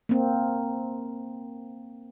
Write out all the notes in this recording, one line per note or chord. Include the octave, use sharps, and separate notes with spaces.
A#3 C4